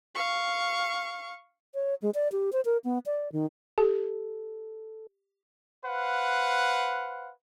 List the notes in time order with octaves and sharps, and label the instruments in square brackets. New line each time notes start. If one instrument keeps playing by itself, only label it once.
[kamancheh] F5 C#6
[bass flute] C#5
G#3
D5
G4
C5
A#4
B3
D5
D#3
[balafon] G4 [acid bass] A4
[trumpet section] B4 C5 F5 F#5